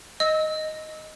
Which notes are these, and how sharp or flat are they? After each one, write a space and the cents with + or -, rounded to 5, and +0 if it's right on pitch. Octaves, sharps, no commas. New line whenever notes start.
D#5 +0 E6 -30